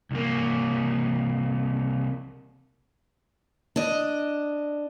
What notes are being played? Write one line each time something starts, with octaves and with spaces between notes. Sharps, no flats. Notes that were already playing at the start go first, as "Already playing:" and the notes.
C2 A#3
D4 D#5